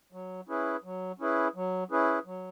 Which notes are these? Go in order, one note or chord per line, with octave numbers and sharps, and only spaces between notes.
F#3
C#4 E4 G#4 B4
F#3
C#4 E4 G#4 B4
F#3
C#4 E4 G#4 B4
F#3